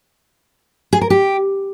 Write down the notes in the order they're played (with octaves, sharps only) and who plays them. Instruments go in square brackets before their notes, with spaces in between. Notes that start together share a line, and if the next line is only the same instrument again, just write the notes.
[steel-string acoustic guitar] G#4
A#4
G4